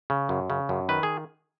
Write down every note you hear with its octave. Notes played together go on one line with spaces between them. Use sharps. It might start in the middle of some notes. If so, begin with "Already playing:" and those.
C#3
F#2
C#3
F#2
D#3 B4
G#4